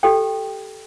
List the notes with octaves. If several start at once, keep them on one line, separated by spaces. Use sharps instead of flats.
G4 A4 G5